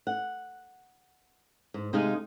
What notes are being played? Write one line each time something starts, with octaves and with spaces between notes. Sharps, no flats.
F#5
G#2
C3 G#3 D#4 G#4 F5